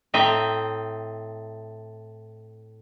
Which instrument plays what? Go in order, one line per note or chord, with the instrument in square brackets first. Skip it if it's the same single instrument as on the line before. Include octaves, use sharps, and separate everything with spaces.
[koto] A2 C4 D#5 E5 A#5